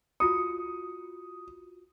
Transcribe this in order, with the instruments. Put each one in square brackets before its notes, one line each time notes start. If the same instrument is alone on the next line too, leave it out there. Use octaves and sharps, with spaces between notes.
[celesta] F4 F#4 C#7 [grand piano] D#6